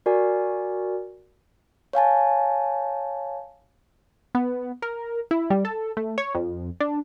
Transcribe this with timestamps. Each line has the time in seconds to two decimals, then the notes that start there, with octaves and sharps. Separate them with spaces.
0.06 F#4 A#4 D5 G#5
1.93 C#5 F5 G#5 A5
4.35 B3
4.82 A#4
5.31 E4
5.50 G3
5.65 A4
5.97 A3
6.18 C#5
6.35 F2
6.80 D4